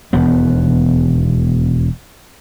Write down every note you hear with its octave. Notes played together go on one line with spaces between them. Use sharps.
E1 D#2 B3